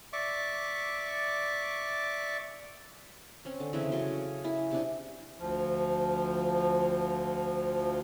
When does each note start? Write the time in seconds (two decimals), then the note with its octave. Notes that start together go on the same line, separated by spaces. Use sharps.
0.13 D5 E5 C#6 D6
3.45 C4 C#4
3.60 D3
3.73 C#3 E3 A3 C4
3.92 C#3 F#3 C6
4.44 E4 G#4
4.71 C3 D4
5.39 D2 F3